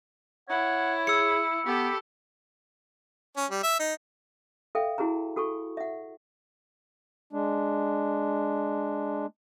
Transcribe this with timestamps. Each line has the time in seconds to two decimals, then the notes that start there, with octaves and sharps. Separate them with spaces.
0.49 E4 C#5 F#5
1.07 G#4 E6 C#7
1.66 B3 G4 A4 B5
3.37 C#4
3.50 G3
3.63 E5
3.79 D#4
4.75 A4 E5 F5 G5
4.98 E4 F#4 G#4 G#5 A#5
5.36 F#4 A4 G#5 C#6
5.77 E5 F#5
7.33 G#3 D4